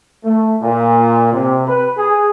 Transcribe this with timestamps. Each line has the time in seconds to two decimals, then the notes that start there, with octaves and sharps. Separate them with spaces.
0.24 A3
0.62 A#2
1.33 C3
1.67 B4
1.97 G#4